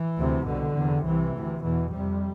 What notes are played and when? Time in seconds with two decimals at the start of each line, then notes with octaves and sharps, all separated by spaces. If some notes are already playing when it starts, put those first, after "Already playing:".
Already playing: E3
0.17 D2 C3
0.46 C2 B2 D3
0.75 E2 C3
1.04 C2 C3 E3
1.34 D2 C3
1.62 E2 B2 E3
1.91 F2 C3 G3